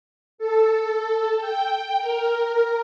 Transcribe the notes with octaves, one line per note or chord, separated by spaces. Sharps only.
A4
G5
A#4